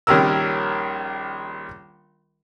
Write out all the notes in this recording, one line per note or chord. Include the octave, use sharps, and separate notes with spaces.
A#1 D#3 G3 C#4 A#4 E6